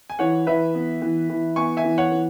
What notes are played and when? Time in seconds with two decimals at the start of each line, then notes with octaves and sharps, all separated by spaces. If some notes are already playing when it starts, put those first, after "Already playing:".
0.10 G#5
0.19 E3 C#5 F#5
0.47 E3 B4 E5
0.75 B3
1.02 E3
1.30 E3
1.56 B3 G#5 C#6
1.77 E5 G#5
1.84 E3
1.98 C#5 F#5
2.12 E3